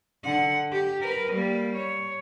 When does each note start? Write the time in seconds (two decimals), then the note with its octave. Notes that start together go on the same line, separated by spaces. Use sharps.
0.24 D3 F#5
0.72 G4
1.01 A#4 B4
1.33 G3 A#3
1.76 C#5